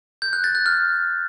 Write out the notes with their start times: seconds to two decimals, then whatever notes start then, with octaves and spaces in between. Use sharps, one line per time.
0.22 G6
0.33 F#6
0.44 A6
0.55 F#6
0.66 F6